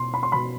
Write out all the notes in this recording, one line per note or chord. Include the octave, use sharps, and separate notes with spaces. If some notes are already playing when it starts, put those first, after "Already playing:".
Already playing: B2 C6
B5
C6
B2 B5